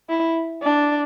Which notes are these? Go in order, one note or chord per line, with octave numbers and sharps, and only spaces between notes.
E4
D4